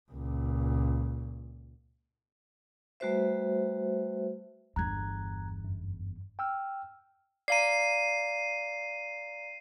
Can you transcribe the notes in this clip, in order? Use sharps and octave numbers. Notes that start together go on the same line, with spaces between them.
C#2 A#2
G3 A3 F#4 B4 C5 E5
G1 E2 A#5 F#6 G#6
F#2
G5 E6 F6
D5 F5 A#5 C7 D#7